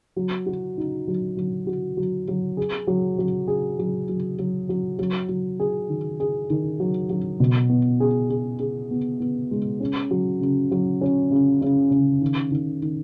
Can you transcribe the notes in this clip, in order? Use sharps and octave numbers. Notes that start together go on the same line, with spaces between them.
F#3
F#4
D#4
F#3
F#3
F#4
F#3
F#3
G#4
F#3
F#3
G#4
F#3
F#3
F#3
F#3
F#3
F#3
G#4
D#3
G#4
D#3
F#3
F#3
B2
B3
G#4
G#4
G#4
B3
B3
G#3
C#4
F#3
C#3
F#3
C#4
C#3
C#3
C#3
D#3
D#3
D#3